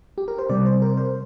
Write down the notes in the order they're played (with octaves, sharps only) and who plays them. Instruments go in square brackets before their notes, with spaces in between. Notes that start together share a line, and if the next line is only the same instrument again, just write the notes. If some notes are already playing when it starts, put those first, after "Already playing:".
[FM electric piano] G4
A#4
C5
C3 G3 D5
C5
A#4
C5